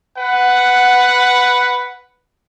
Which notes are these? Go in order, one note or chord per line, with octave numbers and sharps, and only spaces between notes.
B4 F#5